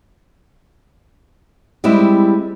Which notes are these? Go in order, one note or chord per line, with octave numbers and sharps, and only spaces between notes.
G3 G#3 C4 E4